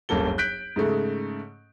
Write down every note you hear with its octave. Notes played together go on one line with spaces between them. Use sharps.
D1 G1 F#2 A#3 A4 G7
F#6 G6 B6 D7
G#2 C#3 A3